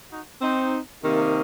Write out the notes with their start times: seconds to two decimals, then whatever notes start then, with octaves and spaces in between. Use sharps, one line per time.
0.11 D#4 F#4
0.42 C4 D#4
1.03 C3 D#3 A#3